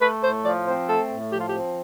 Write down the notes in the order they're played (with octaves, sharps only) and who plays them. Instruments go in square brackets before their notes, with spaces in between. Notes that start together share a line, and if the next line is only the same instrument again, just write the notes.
[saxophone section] A3 B4
A2 C5
F3 D5
C4 C5
A3 A4
A2
F3 G4
F4
G4
C4